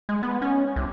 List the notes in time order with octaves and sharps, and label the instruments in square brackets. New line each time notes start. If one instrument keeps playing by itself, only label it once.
[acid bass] G#3
B3
C#4
C2